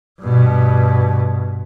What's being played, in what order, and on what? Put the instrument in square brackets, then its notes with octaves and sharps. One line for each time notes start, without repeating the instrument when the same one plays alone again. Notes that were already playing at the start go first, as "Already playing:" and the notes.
[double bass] G2 B2